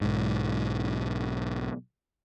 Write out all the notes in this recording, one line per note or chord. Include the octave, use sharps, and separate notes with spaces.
B1 G#2